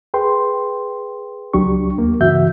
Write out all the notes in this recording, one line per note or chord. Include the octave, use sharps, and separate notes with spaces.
G#4 B4 G5 C6
C#2 F#3 D4 G4 C#6
D#2 A#3
G2 C#3 E3 F#4 E5 G6